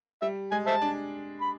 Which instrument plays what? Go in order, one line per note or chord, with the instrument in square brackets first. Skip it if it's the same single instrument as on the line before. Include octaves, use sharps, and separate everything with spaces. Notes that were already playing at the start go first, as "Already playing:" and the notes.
[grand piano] G3 [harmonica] E5
[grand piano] G#3 [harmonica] G#5
[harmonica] C5 E5 A5
[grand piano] D4
[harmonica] B5